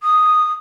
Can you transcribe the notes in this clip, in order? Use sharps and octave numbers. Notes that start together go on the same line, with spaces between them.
D#6